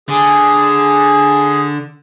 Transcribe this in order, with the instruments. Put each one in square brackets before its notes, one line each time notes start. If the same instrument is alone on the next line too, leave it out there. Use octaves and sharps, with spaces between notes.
[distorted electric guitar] D3 [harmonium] G#4